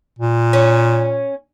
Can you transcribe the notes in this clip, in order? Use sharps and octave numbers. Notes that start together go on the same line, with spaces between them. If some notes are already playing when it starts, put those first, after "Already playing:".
A#2
C#4